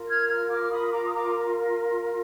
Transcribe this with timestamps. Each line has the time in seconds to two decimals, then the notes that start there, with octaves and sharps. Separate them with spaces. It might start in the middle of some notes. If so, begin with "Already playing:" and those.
Already playing: F4 A#4
0.08 F6 G#6
0.29 F6 G#6
0.50 D6 F6
0.64 D6
0.71 B5 D#6
0.92 A#5 D6
1.06 D#6
1.13 A#5 D6